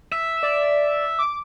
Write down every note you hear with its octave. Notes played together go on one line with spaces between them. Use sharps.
E5
D5
D6